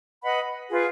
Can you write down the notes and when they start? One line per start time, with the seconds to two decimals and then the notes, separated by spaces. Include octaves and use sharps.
0.22 B4 D#5 F#5 B5
0.69 F4 G#4 B4